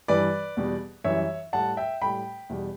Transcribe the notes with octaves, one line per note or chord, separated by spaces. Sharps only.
G2 E3 G3 B4 D5
E2 B2 G3
F#2 E3 G3 C#5 E5
A2 G3 F#5 A5
E5 G5
A2 G3 G5 B5
E2 B2 G3